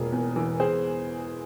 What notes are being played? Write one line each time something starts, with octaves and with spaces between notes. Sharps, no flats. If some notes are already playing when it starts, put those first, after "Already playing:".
Already playing: E1 A#3 F4 G#4
E2
E3
G#4 C5